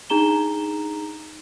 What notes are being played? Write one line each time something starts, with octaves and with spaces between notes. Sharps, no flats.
D4 D#4 G#4 A#5 E7 G7